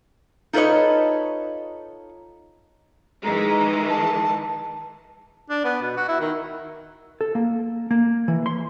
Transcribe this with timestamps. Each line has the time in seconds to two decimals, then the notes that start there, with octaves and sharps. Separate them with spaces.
0.53 D#4 F4 A4 B4 C#5 D#5
3.24 D#3 E3 G#3 A#5
3.89 A5
5.50 D4
5.64 B3
5.82 B2
5.97 F#4
6.08 E4
6.20 D#3
7.21 A4
7.35 A#3
7.91 A#3
8.28 E3
8.46 C6